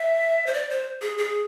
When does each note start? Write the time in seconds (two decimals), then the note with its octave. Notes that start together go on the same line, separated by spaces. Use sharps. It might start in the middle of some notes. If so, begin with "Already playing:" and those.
Already playing: E5
0.47 C5
0.54 D5
0.70 C5
1.02 G#4
1.18 G#4